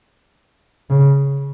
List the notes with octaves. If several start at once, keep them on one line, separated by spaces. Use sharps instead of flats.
C#3